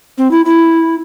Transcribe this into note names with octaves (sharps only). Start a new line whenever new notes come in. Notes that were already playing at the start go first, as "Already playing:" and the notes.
C4
E4
E4